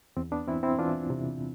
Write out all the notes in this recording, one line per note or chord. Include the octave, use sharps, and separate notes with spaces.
E2 C4
B3 D4
E3 C4 E4
C4 E4
E3 D4 F4
C3